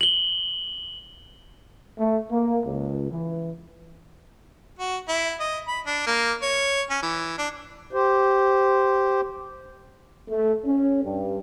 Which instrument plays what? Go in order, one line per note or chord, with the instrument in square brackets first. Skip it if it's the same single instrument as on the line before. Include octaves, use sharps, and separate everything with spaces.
[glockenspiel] F#7 G7
[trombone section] A3
A#3
C#2
E3
[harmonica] F#4
E4
D#5
B5
D4
A#3
C#5
C#4
E3
D4
[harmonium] G4 C5
[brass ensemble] A3
C#4
G2